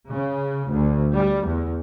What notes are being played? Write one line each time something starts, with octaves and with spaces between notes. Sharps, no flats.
C#3
D2
G3
E2